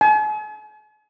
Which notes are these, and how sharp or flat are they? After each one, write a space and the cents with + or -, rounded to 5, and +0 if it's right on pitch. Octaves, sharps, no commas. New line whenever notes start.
G#5 +45